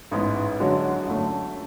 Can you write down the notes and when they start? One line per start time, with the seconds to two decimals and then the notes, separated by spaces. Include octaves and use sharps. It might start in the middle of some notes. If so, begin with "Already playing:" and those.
0.11 A1 G#2 G#3 B3
0.60 F#2 D3 G#3 C#4 F#4
1.07 F#2 D3 A3 C#4